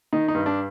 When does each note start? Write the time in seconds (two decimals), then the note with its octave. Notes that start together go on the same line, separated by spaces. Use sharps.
0.13 D#3 D#4
0.28 D#4
0.34 G2
0.46 D4